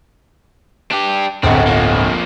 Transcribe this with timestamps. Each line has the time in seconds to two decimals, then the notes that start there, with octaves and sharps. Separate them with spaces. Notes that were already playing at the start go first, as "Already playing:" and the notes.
0.91 D4 G4
1.43 D1 G1 C#3 C4 F#5
1.67 F3 A#3